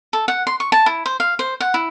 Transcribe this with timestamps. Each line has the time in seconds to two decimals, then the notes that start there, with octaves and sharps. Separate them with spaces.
0.13 A4
0.28 F#5
0.47 C6
0.60 C#6
0.72 A5
0.86 E4
1.06 C5
1.20 F5
1.39 C5
1.60 F#5
1.74 E4